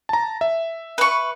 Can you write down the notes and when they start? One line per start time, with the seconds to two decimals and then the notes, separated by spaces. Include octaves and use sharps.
0.09 A5 A#5
0.41 E5
0.98 B4 C#6